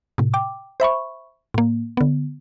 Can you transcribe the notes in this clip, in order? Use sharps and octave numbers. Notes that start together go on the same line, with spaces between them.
A2 C3
G5 D6
C5 E5 B5 C#6
A2 A#3
D3 B3